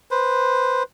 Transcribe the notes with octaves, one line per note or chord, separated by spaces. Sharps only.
B4 C5